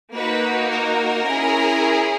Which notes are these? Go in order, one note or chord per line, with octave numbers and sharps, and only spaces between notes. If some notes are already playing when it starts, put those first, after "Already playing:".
A#3 D#4 F#4 B4
A#4
C#4 E4 G#4